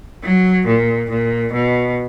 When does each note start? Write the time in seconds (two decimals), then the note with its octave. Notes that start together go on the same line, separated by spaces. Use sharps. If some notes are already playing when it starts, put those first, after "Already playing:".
0.23 F#3
0.66 A#2
1.10 A#2
1.52 B2